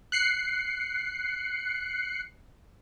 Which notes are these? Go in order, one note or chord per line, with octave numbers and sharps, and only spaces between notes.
F#6 C7 C#7